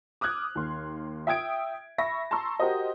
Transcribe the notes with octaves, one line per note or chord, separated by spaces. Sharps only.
D6 D#6 F6 F#6 G#6
D#2 C6
E5 G5 D#6 G#6 D7
E5 B5 C#6 A#6
A5 A#5 C6 C#6 E6
F#4 G4 A#4 C5 D#5